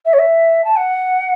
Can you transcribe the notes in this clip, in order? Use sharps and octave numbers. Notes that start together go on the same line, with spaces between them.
E5
C#5
E5
A5
F#5